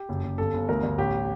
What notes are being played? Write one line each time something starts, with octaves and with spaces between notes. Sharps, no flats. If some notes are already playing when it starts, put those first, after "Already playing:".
Already playing: G4
F#1
F#1
G1 A4
G1
D2 A#4
D2
A1 G4